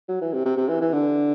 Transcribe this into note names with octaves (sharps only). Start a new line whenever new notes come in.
F#3
E3
C3
C3
C3
E3
E3
D3